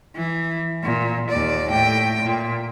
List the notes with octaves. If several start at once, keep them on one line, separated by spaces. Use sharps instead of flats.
E3
A#2
D#2 D5
A2 G5
A#2